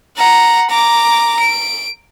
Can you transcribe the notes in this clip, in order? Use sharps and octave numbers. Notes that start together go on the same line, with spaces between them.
F#5 A#5
A#5 D6
D7